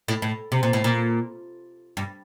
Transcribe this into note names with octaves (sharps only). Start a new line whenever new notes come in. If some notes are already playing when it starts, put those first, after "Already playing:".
A2
A2
C3
A#2
A2
A#2
G2